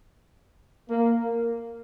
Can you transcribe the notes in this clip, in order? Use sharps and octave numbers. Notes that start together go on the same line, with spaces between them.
A#3